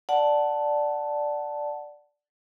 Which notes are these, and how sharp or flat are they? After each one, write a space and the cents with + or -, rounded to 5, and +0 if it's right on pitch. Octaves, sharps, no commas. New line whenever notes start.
D5 +0 F#5 +0 A5 +0